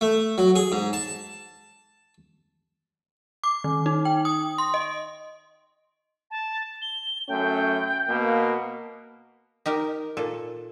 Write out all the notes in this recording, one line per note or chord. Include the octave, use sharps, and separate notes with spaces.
A3
F#3
G#4
G#2
A5
D6
D#3
D#4
G5
D#6
C6
D#5
A5
G7
F#2 A3 C#4 G5
B2 A#3
D#4 G4 A#4
A#2 A4